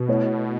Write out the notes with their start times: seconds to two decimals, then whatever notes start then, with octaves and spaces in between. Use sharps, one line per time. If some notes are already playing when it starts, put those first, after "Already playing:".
Already playing: B2
0.08 A3 E4 C#5